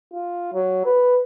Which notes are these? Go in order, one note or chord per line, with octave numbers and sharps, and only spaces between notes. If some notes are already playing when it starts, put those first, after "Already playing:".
F4
F#3
B4